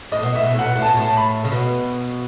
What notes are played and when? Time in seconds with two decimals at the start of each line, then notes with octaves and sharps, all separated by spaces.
0.12 A2 D#5
0.23 B2
0.34 A2 E5
0.43 B2
0.55 A2 F#5
0.66 B2
0.76 A2
0.82 B2 A5
0.97 A2
1.05 A5
1.17 B5
1.44 C#3
1.52 B2